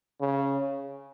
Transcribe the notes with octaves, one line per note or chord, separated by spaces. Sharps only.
C#3